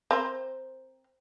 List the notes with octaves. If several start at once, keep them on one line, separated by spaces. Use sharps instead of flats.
C4 A#4 C5